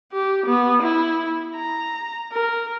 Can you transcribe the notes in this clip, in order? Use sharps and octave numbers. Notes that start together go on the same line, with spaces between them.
G4
B3
E4
A#5
A#4